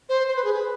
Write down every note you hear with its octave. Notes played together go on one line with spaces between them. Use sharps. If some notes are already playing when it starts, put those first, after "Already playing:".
C5
C5
B4
G#4
B4